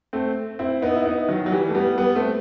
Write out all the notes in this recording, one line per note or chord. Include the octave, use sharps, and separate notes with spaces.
A3 C4
C4 E4
B3 D#4
E4
B3 D#4
D#3 F#3
F#3
E3 G3
A3
G3 B3
G3 B3
A3 C4